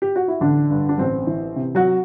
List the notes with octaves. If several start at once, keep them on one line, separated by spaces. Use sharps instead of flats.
G4
F#4
E4
A1 D3 D4
G2
D4
A1 C4
E3
C3
F#3 F#4